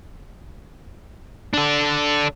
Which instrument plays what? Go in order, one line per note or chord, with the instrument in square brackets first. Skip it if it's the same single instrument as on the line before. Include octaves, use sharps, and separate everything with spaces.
[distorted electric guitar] D4 A4